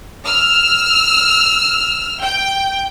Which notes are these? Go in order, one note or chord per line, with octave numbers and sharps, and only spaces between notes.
E6 F6
G5